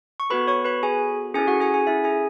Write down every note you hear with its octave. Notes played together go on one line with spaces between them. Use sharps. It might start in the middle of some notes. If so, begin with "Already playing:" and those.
C#6
B3 F#4 A4 B4 B5
C#5 C#6
B4 B5
G#4 G#5
C#4 E4 G#4 A4 G#5
F#4 F#5
G#4 G#5
G#4 G#5
E4 E5
G#4 G#5